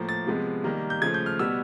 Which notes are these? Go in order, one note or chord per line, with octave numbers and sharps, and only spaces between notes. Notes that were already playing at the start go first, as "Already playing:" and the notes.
Already playing: A2 F3 A#3
A6
C3 F3 G#3 B3
D#3 G3 A#3
G6
C#3 F3 A3 G#6
G6
F6
B2 G3 B3 E6